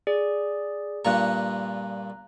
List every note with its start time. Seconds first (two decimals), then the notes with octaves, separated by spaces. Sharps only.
0.07 G#4 D5
1.05 G2 A#2 A#5 C#6 F#6